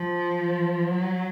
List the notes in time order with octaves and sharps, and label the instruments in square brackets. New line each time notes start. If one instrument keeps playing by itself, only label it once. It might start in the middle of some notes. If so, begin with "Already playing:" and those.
Already playing: [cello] F3
F#3